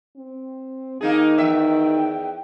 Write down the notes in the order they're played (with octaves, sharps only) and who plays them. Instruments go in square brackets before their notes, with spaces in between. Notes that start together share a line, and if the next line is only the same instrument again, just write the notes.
[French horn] C4
[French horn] D#3 [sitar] A#3 D#4 G#4
[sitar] E2 E5 [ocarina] G5